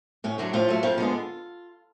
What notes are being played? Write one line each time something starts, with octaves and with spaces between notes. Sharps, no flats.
A2 C#4
D3 F#3 A3 D4
A2 F3 F4
F#3 A3
F2 F3 F4
D3 G#3 B3